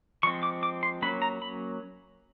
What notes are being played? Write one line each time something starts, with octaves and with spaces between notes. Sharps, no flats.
F3 G#3 C4 C#6
D6
D6
C6
F#3 A#3 C#4 B5
A#5
B5